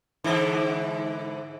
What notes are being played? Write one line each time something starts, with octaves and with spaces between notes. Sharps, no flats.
G#2 D3 E3